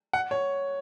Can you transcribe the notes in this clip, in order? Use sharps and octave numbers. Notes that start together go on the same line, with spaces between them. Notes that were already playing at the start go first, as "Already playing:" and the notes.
F#5
C#5